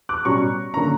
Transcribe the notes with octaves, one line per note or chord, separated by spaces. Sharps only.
D6 F#6
B2 G3 C#4 A#5 C#6
D3 A#3 C#4 A#5 C#6